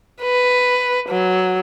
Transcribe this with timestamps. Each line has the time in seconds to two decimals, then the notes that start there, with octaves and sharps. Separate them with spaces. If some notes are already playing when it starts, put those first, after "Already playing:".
0.22 B4
1.09 F#3